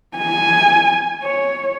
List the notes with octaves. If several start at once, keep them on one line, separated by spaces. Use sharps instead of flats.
G#5
C#5